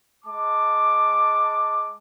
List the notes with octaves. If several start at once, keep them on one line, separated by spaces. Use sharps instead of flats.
G#3 A5 D6